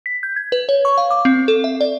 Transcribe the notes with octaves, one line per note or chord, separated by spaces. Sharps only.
B6
G6
G#6
B4
C#5
C#6
F5
D6
C4
A4
E5
D5